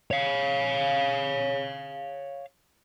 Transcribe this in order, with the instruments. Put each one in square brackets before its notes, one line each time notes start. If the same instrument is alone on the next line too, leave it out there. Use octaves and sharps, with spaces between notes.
[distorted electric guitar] C#5 F5